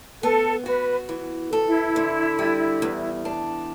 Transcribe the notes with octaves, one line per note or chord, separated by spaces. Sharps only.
B3 A4
F#4 B4
E3
A4
E4
D3
G3
E2
D4